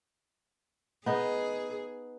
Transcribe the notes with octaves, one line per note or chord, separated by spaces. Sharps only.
B3 D#4 G#4